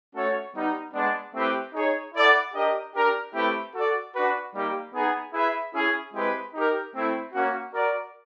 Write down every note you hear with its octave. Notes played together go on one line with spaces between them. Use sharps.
A3 C#4 F#4 A4 C#5
G3 B3 D#4
G#3 B3 D4
A3 C4 E4 G4 B4
D#4 G#4 C#5
E4 A4 D5 F#5
D4 G4 A#4 D#5
D4 G4 A#4
A3 C4 E4 G4 B4
F#4 A4 D5
D4 F#4 B4
G3 A#3 D#4 G4
B3 D#4 G#4
E4 G#4 B4 E5
C#4 E4 G#4
G#3 C4 E4 G4 B4
D#4 G4 A#4
A3 C4 E4
A#3 C#4 F#4
F#4 A#4 D5